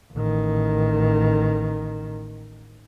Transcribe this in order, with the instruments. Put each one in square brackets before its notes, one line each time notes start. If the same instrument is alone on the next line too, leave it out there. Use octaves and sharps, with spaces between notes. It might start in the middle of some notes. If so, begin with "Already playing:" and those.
[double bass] A1 D#3